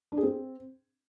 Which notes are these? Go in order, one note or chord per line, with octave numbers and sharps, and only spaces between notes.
D4
G#4
C4